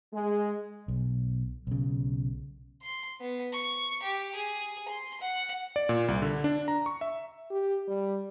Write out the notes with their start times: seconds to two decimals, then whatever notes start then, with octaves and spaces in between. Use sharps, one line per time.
0.14 G#3
0.88 B1
1.67 B1 C#3
2.82 C6
3.21 B3
3.53 C#6
4.03 G4
4.35 G#4
4.88 C6
5.21 F#5
5.76 D5
5.89 A#2
6.08 C2
6.22 D3
6.44 D4
6.68 A#5
6.86 C#6
7.01 E5
7.50 G4
7.88 G3